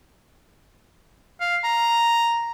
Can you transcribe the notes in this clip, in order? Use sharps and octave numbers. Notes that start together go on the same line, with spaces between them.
F5
A#5